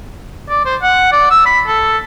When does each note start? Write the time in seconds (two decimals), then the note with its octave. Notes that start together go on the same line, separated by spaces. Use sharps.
0.50 D5
0.65 C5
0.82 F#5
1.13 D5
1.31 E6
1.46 B5
1.67 A4